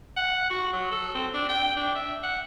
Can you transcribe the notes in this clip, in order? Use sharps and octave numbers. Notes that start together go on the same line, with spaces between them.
F#5
F#4
F#3
A4
C4
D4
G5
D4
E5
F#5